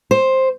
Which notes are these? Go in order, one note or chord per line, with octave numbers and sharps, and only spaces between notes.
C5